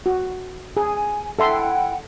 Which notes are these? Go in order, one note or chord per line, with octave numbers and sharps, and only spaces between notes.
F#4
G#4 G#5
E4 A4 E5 F#5 G5 C6